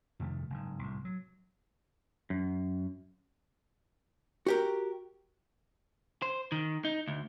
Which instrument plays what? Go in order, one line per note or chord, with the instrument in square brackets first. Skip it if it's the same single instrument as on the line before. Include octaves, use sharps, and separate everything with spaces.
[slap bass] F2 C3 D#3 A3
F#1 G#2
C2 A2
F#3
[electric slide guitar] F#2
[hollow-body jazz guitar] F#4 G4 A#4
[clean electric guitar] C5
D#3
D#4
D2